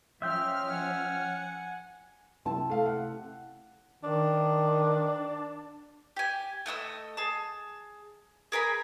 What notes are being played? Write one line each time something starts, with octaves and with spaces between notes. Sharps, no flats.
F3 C#4 D#5 E5 G5 C6 F6
F#5 G#5
C3 E4 A5
A3 F5
F#5
D#3 D4
G4 G#5
A3 D#5 F#5 E6
G#4 A5
G#4 A#4 G#5 B5